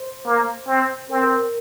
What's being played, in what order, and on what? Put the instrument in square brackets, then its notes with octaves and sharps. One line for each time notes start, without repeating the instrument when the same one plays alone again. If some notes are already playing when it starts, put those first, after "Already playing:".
Already playing: [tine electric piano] C5
[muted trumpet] A#3
C4
[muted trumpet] C4 [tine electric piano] A#4
[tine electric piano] A#4